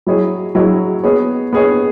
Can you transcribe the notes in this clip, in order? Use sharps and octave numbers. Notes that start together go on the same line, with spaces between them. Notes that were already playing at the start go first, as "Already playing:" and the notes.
F#3 E4 G#4 C#5
F#3 E4 G#4 C#5
B3 G#4 C#5
B3 G#4 C#5